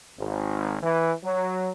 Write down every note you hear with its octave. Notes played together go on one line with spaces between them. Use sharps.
G#1
E3
F#3